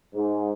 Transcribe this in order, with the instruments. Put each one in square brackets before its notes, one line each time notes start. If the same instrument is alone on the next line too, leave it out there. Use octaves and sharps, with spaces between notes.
[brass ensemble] G#2